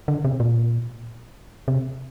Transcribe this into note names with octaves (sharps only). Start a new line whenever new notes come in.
D3
C3
A#2
C3